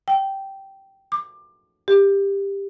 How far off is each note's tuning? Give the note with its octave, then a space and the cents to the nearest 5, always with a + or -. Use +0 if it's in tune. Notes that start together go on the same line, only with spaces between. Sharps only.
G5 -10
D6 +25
G4 +15